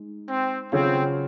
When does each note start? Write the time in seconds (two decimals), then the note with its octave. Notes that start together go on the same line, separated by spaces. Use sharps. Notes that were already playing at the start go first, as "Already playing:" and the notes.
Already playing: G#3 D#4
0.29 C4
0.72 C#3 F#3 C4 C#4 F4 G#4